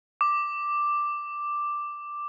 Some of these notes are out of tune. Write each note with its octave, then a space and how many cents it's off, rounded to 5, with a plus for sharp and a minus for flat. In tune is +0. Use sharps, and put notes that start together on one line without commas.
D6 +5